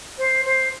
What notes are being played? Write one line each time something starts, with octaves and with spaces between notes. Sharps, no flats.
C5
C5